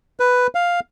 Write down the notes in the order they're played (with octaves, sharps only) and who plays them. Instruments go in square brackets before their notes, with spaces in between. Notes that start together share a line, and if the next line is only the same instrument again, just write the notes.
[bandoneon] B4
F5